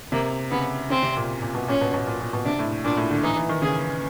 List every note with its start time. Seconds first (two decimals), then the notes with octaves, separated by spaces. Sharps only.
0.12 C3 A#3
0.51 C#3 B3
0.90 C#3 C4
1.03 C3
1.16 A#2
1.42 A#2
1.55 B2
1.68 A#2 C#4
1.81 B2
1.94 B2
2.07 A#2
2.20 A#2
2.33 B2
2.45 C3 D4
2.59 A2
2.85 A#2 D4
2.97 A2
3.11 D3
3.23 E3 D#4
3.36 E3
3.49 D#3
3.62 C#3 G#4